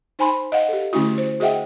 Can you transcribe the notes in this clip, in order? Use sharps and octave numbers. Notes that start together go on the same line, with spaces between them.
D#4 C5 G#5 B5 C6
D#5 F5 F#5
G4 A4
D3 A3 C#4 E4 F#4
C5
F#4 G#4 D#5 E5 F#5 G5